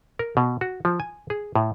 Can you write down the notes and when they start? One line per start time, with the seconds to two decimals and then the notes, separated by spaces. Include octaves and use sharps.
0.19 A#4
0.37 B2
0.61 F#4
0.85 F3
1.00 G#5
1.30 G#4
1.55 A2